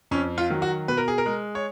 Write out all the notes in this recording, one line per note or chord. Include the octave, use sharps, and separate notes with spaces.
F2 C#4
F4
D#3 F#3
F#4
B2 B4
A#4
G#4
A#4
G#3
C#5